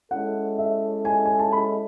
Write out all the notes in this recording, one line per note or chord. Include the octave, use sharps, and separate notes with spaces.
G#3 C#4 E4 A4 F#5
E5
G#5
G#5
A5
B5